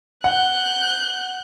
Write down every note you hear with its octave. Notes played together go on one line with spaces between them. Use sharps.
F#5 F#6 G6